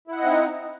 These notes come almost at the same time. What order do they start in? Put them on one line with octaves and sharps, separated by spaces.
E4 F#5 D#5 C4 D#4